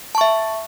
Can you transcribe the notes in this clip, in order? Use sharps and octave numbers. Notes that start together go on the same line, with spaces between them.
E5 A5 C#6